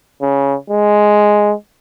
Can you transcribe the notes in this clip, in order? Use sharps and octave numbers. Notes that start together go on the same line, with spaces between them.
C#3
G#3